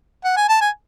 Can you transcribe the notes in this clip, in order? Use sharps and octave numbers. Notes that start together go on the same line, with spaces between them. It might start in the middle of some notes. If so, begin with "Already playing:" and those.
F#5
G#5
A5
G#5